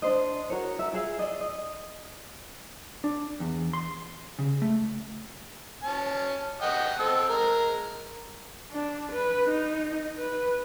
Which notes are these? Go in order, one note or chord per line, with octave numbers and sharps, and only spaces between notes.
D4 D#4 C5 D#5
F#4 A#4 C#5
A#4 E5
F4 G#4 E5 F5
D5 D#5
D#5
D4
E2
C6
C#3
A3
C#4 A5
D#5 F#5 G5
C4 A5 E6
G#3 A#4
D4
B4
D#4
B4